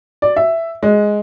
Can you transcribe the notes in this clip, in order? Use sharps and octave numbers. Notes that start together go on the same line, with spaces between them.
D5
E5
G#3